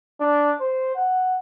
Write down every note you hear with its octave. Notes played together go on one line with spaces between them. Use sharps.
D4
C5
F#5